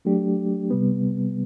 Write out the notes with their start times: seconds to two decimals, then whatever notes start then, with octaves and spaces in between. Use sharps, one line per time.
0.05 F#3 A3 D4 G4
0.70 C3 G3 B3